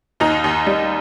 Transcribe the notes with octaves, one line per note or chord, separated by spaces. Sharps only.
D#2 D#4
D#2
G3